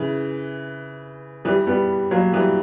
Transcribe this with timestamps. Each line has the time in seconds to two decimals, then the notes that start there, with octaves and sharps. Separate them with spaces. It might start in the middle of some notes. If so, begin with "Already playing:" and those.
Already playing: C#3 E3
1.45 E3 G3
1.67 G3 B3
2.11 F#3 A#3
2.33 E3 G3